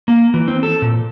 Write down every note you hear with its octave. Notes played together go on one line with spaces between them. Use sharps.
A#3
E3
C4
A4
A#2